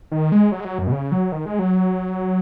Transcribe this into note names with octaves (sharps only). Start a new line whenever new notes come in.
D#3
G#3
F#3
G#3
F#3
F#2
B2
C#3
F#3
D#3
G#3
F#3